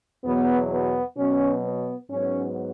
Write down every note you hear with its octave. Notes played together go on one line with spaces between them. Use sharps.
E2 B2 F#3 B3
B3
B2 F#3 B3 C#4
B3
G#2 F#3 B3 C#4